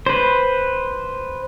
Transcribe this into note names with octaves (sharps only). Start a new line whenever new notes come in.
B4 C5